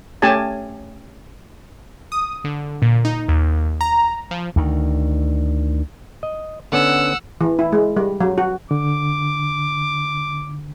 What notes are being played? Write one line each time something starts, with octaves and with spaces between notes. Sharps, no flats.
A3 C#4 G4 G#5 A5
D#6
D3
A#2
D#4
D#2
A#5
F3
D2 D#3
D#5
D3 B3 C#4 F#5 E6
E3
E4
G#3
G3
F#3
F#4
D3 D6